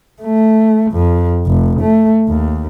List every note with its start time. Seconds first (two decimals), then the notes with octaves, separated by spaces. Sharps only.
0.22 A3
0.92 F2
1.47 F1
1.80 A3
2.29 D#2